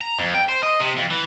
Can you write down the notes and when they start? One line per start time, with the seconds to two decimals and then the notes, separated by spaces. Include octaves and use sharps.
0.01 A#5
0.19 F2
0.34 G5
0.49 C5
0.63 D#5
0.80 C3
0.97 F2
1.10 E3